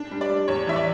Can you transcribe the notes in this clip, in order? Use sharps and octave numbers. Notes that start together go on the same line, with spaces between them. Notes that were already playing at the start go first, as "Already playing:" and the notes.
Already playing: D4
G3
D5
G3
E2 C#5
E3 E5
D5